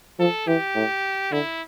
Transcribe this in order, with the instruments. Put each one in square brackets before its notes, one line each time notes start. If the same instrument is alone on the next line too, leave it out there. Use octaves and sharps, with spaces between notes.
[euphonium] F3 [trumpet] A4
[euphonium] E3 [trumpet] G4
[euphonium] A2
[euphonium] D3 [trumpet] E4